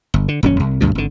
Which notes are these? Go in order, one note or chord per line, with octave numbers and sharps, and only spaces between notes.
G1
D3
D#1 F#2 C4 C#4
C2
D2 G2 B2
G#1 D3